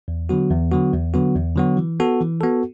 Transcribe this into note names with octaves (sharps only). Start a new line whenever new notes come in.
E2
D3 F#3 B3 F#4
E2
D3 F#3 B3 F#4
E2
D3 F#3 B3 F#4
E2
D3 F#3 B3 F#4
E3
B3 F#4 A4
E3
B3 F#4 A4